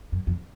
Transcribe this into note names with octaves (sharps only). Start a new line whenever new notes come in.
F#2
F2